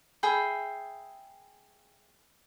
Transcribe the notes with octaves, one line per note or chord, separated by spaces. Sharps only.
G#4 E5 G5 B5